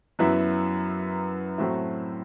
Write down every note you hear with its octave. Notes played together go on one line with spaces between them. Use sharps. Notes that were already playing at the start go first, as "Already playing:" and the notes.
F#2 F#3 B3 E4
A2 F#3 A3 C4 E4